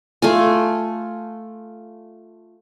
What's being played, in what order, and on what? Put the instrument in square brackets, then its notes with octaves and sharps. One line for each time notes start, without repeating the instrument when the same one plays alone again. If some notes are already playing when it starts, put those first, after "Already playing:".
[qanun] A3 F4 G#5